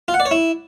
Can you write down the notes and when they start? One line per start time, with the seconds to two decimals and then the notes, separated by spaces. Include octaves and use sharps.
0.08 F4
0.14 F#5
0.20 D5
0.26 C#5
0.31 E4